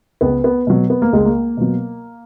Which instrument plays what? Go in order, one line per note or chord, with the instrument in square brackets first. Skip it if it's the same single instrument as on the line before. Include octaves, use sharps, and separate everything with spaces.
[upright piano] C#2 B3
B3
B2 F#3
B3
A#3
C#2 G#3
A#3
B2 F#3